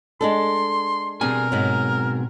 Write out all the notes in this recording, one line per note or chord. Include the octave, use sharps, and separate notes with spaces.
G#3 D4 A4 C6
B2 G3 C4 D4 G#4 A#4 G#5
G#2 F#3